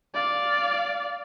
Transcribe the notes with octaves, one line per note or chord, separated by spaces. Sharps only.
D5 F5